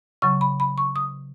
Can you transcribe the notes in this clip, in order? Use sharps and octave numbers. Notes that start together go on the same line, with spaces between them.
C#3 F#3 C#6
B5
B5
C#6
D#6